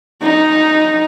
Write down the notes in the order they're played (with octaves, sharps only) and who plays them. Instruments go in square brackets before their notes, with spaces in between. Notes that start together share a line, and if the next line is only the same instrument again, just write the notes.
[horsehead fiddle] D#4